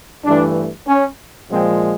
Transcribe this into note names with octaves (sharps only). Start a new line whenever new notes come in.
G2 E3 A3 D4
C#4
A#2 F3 G#3 C4